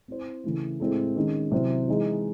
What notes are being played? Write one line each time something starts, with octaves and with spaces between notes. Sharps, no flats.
C4 E4 C5
C#3 E3 A3
A2 G#3 C4 E4 A4
D#3 G#3 C#4
C3 F#3 C4 E4 C5
E3 G#3 D#4 G#4